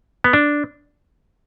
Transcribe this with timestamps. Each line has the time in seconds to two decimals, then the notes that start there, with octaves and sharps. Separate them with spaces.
0.24 B3
0.33 D4